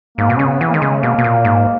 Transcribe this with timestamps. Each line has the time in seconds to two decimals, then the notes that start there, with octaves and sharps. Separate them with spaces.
0.18 G#2 A#3
0.30 B2
0.36 C#3 C#4
0.46 B3
0.61 E3
0.69 A#3
0.74 D#3 G#3
0.82 C#3
1.02 B2 A#3
1.19 B2
1.24 A#2
1.45 G#2